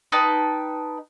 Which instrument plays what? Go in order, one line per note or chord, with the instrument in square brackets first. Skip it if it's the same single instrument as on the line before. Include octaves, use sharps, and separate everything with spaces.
[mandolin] D#4 B4 G5 A5